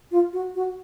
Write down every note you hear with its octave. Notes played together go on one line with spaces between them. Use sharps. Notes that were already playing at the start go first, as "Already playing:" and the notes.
F4
F#4
F#4